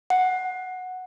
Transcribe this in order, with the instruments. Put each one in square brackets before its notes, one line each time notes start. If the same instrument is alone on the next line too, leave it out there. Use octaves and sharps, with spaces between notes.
[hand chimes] F#5